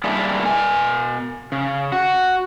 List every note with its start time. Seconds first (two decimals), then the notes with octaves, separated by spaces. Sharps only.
0.04 G3 A#3 D4 E4 G#4
0.45 B2 G#5
1.52 C#3
1.92 F#4